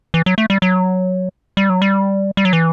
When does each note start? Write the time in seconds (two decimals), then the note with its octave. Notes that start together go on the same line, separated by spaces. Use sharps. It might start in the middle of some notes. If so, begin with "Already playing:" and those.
0.14 E3
0.26 F#3
0.38 A3
0.50 G3
0.62 F#3
1.57 G3
1.70 F#3
1.82 G3
2.37 G3
2.45 F#3
2.53 E3